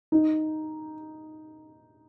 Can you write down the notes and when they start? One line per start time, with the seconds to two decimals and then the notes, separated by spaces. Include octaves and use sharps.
0.12 D#4